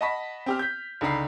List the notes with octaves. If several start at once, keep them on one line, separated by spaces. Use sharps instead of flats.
D#5 F#5 A5 B5 C#6 B6
C4 G4 F6
G6 B6
C#2 D3 D#4 A#5 B5 C7